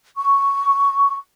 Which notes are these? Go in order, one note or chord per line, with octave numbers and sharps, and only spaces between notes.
C#6